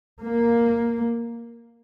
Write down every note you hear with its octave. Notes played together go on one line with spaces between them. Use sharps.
A#3